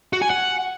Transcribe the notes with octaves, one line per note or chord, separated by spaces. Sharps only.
F#4
G#5
F#5